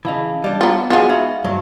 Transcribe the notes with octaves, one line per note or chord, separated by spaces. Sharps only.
C#3 E3 D#5 F5 A5
G3 D4 D#5
B3 F4 A#5
G#3 B3 F4 F#4 G#4
D#4 E5 F5 B5
G2 F#3